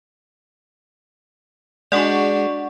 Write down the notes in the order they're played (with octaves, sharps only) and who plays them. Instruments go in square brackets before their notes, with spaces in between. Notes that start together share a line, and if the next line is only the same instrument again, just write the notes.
[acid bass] G#3 [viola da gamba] D4 F#4 [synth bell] D5 F#5 C#6